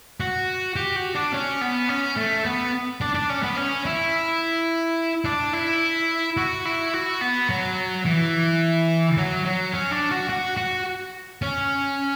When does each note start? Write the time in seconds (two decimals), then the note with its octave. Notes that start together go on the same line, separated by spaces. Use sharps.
0.20 F#4
0.76 G4
0.96 F#4
1.15 D4
1.33 C#4
1.61 B3
1.89 C#4
2.16 A3
2.45 B3
3.01 D4
3.15 D4
3.29 C#4
3.43 B3
3.57 C#4
3.86 E4
5.25 D4
5.53 E4
6.37 F#4
6.65 E4
6.94 F#4
7.21 B3
7.50 F#3
8.06 E3
9.18 F#3
9.45 F#3
9.74 C#4
9.92 D4
10.11 F#4
10.29 F#4
10.57 F#4
11.42 C#4